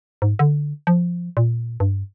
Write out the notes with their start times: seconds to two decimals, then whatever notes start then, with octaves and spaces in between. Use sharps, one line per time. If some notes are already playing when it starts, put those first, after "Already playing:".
0.22 G#2
0.39 D3
0.87 F3
1.37 A#2
1.80 G2